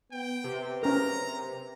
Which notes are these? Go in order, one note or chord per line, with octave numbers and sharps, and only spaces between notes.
B3 G5
C3 B4
C#4 A#4 A#5